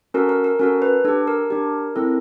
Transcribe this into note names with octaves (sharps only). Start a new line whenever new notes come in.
C#4 F#4 A4 A#4
A#4
A#4
C#4 F#4 A4 A#4
B4
D4 G4 A4
A#4
D4 G4
C4 E4 A4